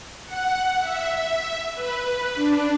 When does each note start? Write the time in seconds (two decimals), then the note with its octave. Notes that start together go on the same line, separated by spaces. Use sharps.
0.25 F#5
0.79 E5
1.74 B4
2.34 D4